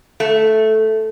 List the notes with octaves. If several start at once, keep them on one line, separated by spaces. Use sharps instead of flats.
A3